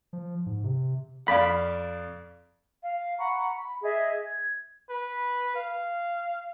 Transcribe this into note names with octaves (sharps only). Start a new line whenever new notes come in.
F3
G#2
C3
F2 D5 F5 B5
F5
F#5 A#5 B5 C#6
B5
G#4 D#5 E5
G#6
B4
F5